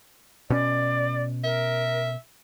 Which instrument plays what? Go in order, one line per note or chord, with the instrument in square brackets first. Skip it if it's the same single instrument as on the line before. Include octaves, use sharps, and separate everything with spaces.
[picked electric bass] B2 C#4 [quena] D5
[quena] A#4 [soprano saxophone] E5